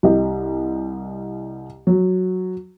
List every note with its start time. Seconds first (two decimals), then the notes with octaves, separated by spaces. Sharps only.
0.03 C2 G4 D#5
1.87 F#3